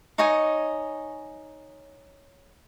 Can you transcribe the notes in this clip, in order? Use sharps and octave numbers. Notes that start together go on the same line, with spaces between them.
D#4 C#5 D#5 G#5